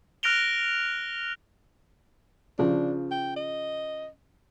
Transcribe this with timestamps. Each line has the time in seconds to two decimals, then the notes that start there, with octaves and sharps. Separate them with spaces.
0.23 F6 F#6 A#6 D7 F7 G7
2.59 C#3 F3 D4
3.11 G5
3.37 D#5